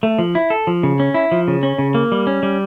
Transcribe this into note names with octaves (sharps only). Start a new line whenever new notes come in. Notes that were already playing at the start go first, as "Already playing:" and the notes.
A3
F3
E4
A4
F3
C#3
C#4
E4
F3
C#3
C#4
C#3
A#3
G3
C#4
G3